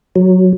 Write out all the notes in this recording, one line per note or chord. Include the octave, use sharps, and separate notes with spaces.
F#3